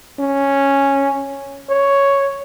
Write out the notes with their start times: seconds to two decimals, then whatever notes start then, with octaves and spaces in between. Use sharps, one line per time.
0.19 C#4
1.69 C#5